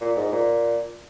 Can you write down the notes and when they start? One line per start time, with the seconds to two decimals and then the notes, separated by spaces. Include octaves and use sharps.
0.01 A#2
0.16 G#2
0.32 A#2